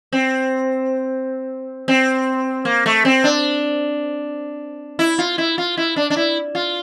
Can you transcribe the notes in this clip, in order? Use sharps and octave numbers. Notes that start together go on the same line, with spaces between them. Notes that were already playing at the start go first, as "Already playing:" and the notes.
C4
C4
A#3
A3
C4
D4
E4
F4
E4
F4
E4
D4
D4
E4
F4